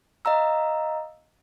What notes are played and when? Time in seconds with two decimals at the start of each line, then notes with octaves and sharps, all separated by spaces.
0.25 D#5 F5 A#5 E6